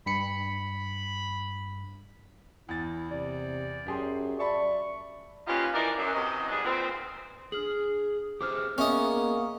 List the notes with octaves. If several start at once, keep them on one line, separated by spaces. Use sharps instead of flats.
G2 B5 C#7
E2 E4 A6
C3 D5
F#2 G4 G#4 C6
D5 E5 A5 B5 C#6
A#3 C#4 D#4 F4 G4 B4
E3 F3 D#4 A#4 D5
F#2
F#2 C3 E3 D#5
G#2 G3 D4 G#4
A#2 D#3 B3 C4
D4 G#4 F6 F#7
G4 G#4 C5 D6 F6
A#3 B3 C#4 G#4 D#5 E5